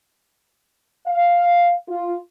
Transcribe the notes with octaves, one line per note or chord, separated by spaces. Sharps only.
F5
F4